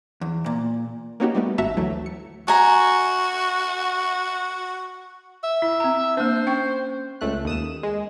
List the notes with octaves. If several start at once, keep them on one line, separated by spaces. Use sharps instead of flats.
E2
A#2
A#3 B3 C#4 D#4 F#4 G4
G3 A3 B3
G#1 F#4 E5 A5 A#5 B6
D2 E3 F#3 A3
C#7
F#4 G#5 A#5
E5
E4
C4 A#5
A#3 D4 C5
C#4 G5 C#6
C#2 A3 F#6
D#2 D#6 E7
G#3